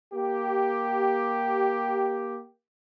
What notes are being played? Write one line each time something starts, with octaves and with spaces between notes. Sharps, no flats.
A#3 G4